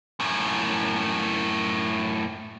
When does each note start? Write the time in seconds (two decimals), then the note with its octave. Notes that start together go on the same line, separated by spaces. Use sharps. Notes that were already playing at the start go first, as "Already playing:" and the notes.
0.20 F#2 A2